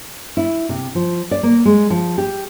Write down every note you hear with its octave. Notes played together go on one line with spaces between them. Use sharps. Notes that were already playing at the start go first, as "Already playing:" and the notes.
E4
C3
F3
D5
A#3
G#3
F3
G4